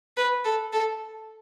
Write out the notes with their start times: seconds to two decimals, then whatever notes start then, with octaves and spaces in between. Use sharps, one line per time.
0.17 B4
0.45 A4
0.73 A4